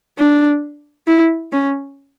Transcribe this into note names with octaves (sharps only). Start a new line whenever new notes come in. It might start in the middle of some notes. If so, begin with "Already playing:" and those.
D4
E4
C#4